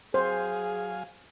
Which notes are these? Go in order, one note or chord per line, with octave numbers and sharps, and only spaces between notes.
F#3 G#4 C5 F5 G#5